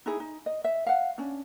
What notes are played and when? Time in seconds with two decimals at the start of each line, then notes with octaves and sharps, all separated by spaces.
0.06 D#4 E4 G#4
0.20 D#4
0.46 D#5
0.64 E5
0.86 F5 F#5
1.18 C#4 D4